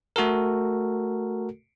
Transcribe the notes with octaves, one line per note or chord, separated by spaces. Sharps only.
A3 F#4 A4 A#4